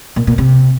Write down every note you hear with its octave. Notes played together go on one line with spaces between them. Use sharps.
A#2
A#2
C3